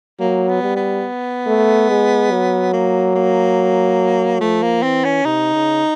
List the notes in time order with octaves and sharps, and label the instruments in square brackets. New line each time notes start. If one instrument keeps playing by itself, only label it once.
[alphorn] F#3 [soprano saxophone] A#3
[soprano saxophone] B3
[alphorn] G3
[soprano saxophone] B3
[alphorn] A3
G#3
F#3
[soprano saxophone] A#3
A#3
[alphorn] F3 [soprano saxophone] A3
[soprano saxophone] A#3
[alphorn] E3 [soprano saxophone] C4
[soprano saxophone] C#4
[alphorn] C3 [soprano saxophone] D#4
[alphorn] C#3